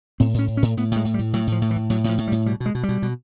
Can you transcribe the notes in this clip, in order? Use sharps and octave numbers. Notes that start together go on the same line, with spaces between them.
A2 C4
A2 C#4
A2
C#4
A2
A2 B3
A2 G#3
A2
G3
A2
A2 F#3
A2 F3
A2
E3
A2
A2 F#3
A2 F3
A2
G3
A2
B2 G3
B2
G#3
B2
G3
B2
B2